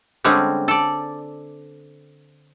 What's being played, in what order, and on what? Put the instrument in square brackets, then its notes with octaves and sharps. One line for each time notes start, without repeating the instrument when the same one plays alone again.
[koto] D3 G3 G#3 C4 C#4
A4 D5